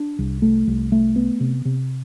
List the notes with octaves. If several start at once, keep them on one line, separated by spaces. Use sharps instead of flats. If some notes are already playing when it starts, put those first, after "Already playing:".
Already playing: D4
C2
A3
C2
A3
B3
C3
C3